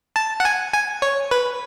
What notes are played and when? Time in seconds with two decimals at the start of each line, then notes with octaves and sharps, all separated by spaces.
0.16 A5
0.40 F#5
0.45 G#5
0.73 G#5
1.02 C#5
1.31 B4